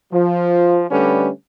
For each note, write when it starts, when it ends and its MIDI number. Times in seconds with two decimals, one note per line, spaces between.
0.12 0.83 53
0.91 1.29 50
0.91 1.29 55
0.91 1.29 57
0.91 1.29 61
0.91 1.29 71